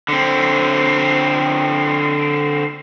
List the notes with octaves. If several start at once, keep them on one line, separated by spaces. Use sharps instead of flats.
D3 C4